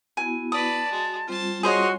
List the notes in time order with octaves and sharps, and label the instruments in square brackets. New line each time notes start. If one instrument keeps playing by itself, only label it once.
[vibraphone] B3 E4 F#4 [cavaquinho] G#5
[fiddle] B4 D5 [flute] A5 [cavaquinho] D#6
[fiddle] G#3 [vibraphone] F#4
[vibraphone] G3 C4 F4 [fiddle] C5 A5
[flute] F#4 [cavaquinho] G#4 C5 D#5 [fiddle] C#5 C6